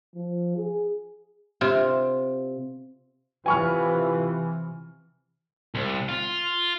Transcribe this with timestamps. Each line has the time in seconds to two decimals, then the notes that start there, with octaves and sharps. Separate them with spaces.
0.15 F3
0.57 G#4
1.61 C3 F4
3.46 C3 E3 F4 B4 G#5 C#6 F6
5.75 C2
6.09 F4